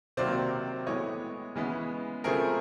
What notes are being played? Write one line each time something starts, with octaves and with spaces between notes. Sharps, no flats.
C3 D#3 F#3 A#3 C5 D5
A2 E3 G#3 B3 C#5 D#5
C#3 E3 G#3 B3
C#3 F3 A3 C4 G#4 A#4